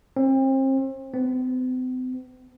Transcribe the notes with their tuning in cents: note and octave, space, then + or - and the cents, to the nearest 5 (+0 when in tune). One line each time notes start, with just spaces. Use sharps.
C4 +35
C4 -45